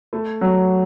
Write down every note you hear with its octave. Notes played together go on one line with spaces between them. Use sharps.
A3
F#3